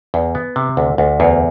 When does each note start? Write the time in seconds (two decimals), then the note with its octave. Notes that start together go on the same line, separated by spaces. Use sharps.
0.14 E2
0.35 B3
0.56 C3
0.77 D2
0.98 D2
1.20 E2